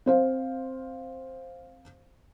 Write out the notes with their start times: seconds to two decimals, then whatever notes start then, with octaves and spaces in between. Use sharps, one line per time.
0.06 C4 C5 F5